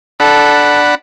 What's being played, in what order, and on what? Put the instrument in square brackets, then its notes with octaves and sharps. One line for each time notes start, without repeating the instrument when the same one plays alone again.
[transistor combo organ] D4 F#5 B5 [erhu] A4